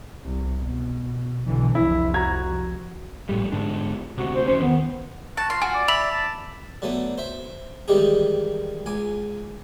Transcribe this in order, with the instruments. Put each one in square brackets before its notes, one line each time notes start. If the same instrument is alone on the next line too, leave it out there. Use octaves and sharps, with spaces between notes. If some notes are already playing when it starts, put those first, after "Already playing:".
[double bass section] C2
B2
B1 D3 E3
[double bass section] C2 F2 [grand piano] E4
[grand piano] F#4 A#5 G#6
[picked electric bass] A#1 A2 G3
G#2 D3 D4
[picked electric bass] D2 C3 [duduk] F#4
[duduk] C5
[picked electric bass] E2 C#4 [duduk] C5
[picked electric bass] D#3 [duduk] B3
[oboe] F#4 [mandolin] A5
[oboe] F4 [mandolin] C6
[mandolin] F#4 [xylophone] G#5
[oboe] D5
[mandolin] E5 [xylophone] B5 F7 F#7
[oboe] A5
[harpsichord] D3 F#3 A3 B3
C5 E5
D#3 E3 G3 G#3 G4 G#4
C#2 G#5 D6